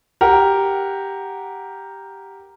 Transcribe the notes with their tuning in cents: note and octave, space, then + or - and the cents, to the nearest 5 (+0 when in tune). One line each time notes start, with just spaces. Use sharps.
G4 +0 A#4 +0 F#5 +0